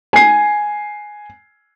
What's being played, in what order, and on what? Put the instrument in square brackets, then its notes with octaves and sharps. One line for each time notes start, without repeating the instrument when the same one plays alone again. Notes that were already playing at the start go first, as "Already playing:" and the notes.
[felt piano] G#5 C7